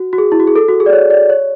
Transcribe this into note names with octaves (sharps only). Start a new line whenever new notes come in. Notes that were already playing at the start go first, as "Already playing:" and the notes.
Already playing: F#4
F#4
G#4
E4
F#4
G#4
A4
F#4
G#4
D5
C#5
D5
C#5